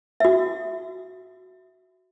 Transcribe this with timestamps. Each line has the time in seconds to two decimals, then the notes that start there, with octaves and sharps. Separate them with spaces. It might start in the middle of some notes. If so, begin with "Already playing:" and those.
0.20 F#4 E5